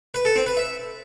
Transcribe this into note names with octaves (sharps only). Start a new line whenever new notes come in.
B4
A4
C4
B4
E5